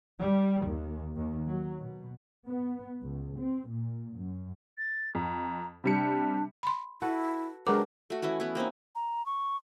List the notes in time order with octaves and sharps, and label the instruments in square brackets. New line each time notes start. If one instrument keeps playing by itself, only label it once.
[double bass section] G3
D#2
D#2
F#3
B2
B3
C#2
C4
A#2
F#2
[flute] A6
[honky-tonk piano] F2 [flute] A#5
[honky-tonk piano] C3 G3 C#7 [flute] D4
[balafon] B5 C6
[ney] E4 [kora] F#4 A4 B4
[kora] F#3 G4 [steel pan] G#3 A#4 B4 [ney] D4 [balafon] G#4 D6
[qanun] A3 F#4
E3 C#4 E4 F#4
B3 E4
A#3 C4 C#4 D#4
[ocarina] A#5
C#6